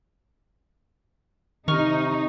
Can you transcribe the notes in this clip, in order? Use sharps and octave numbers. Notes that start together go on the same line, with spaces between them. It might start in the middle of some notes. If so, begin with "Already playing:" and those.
C3 D#3 D#4 C#6 F6